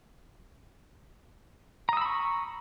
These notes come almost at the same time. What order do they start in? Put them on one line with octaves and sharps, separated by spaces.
A#5 D#6 E6 B5 C#6